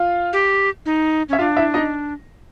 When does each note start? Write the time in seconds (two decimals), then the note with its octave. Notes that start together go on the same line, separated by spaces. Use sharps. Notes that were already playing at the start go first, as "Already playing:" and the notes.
Already playing: F4 F5
0.33 G4
0.86 D#4
1.29 C#4 E5
1.39 D4 F4 F5
1.57 E4 E5
1.74 D#4 D#5